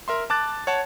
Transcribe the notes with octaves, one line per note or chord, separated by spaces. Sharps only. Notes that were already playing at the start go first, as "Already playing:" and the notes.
A#4 E5 C6
A5 D6 F#6 A6
C#5 F#5 A5